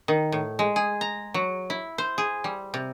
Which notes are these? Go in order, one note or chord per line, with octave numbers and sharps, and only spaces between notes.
D#3
A2
G#3
G#4
A#5
F#3
E4
C5
G#4
G3
C3